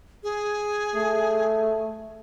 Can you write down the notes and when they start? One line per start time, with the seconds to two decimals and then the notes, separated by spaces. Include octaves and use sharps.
0.23 G#4
0.95 A3